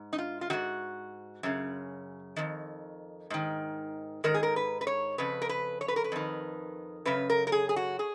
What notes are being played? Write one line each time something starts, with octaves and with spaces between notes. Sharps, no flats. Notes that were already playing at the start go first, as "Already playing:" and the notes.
Already playing: G#2
D#4
F4
F4
G#2 D#3 F#4
F#2 C#3
F2 D#3
G#2 D#3
G#2 D#3 A#4
G#4
A#4
B4
B4
C#5
F2 C#3 B4
A#4
B4
C#5
B4
A#4
B4
F2 D#3
F#2 C#3 B4
A#4
A#4
G#4
G#4
F#4
G#4